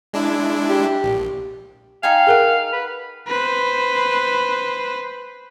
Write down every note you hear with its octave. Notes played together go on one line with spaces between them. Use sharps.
G#3 D4 E4
G4
A#1
D#4 F5 G5 G#5
G#4 A#4 F#5
B4
B4 C5